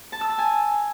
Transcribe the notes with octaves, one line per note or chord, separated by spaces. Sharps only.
A5
E6
A5
G#5